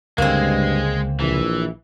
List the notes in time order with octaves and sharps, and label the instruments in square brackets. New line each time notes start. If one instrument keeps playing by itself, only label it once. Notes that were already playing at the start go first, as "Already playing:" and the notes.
[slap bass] C#2 D3 [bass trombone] G2 [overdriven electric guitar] G#3 [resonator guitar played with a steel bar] A#3 C4
[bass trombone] A#1 [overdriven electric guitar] E3